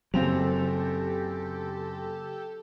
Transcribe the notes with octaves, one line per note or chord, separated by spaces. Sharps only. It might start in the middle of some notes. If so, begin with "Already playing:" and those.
F#1 C#3 F#3 A#3 C4 G4 A4 F7